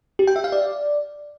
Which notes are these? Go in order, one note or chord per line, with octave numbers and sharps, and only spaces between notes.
G4
G5
E5
F5
D5